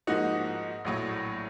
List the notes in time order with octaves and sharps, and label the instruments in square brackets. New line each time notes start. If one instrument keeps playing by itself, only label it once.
[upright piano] G#2 F3 A#3 D#4 F#4
A#1 A2 F#3